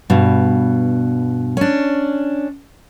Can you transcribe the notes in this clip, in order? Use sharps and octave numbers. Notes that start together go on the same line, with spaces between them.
G2 B2
C#4 D4